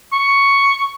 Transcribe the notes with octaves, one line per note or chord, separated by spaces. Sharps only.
C#6